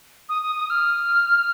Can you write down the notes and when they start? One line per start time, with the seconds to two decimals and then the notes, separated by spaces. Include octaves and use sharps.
0.29 D#6
0.42 D#6
0.56 D#6
0.70 F6